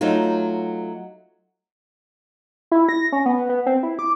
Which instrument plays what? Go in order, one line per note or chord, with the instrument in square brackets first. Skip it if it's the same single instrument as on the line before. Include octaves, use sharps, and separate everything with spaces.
[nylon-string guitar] F#3 A3 D#4 F4
[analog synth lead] E4
A#6
C#4
B3
B3
C4
E4
D6